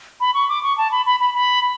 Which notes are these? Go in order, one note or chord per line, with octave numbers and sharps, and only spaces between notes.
B5
C#6
D6
C#6
A5
B5
B5
B5
B5